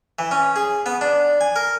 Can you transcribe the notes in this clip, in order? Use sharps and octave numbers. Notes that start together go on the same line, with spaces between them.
E3
C#4
G#4
B3
D4
G#5
A#4